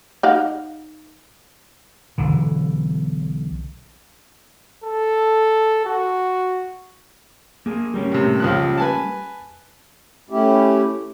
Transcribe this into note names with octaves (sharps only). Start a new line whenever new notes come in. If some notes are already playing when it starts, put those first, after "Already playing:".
D#4 F5 F#5
B1 D3 E3
A4
F#4
A#3 G#4
G3 A#3 C#4
A2 C3
C#2 F3 F#6
B4 G#5 A5
A3 C#4 E4 G4